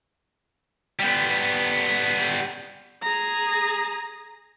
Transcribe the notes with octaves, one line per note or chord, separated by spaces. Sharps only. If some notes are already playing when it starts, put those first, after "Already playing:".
G3 B3
G#4 A#5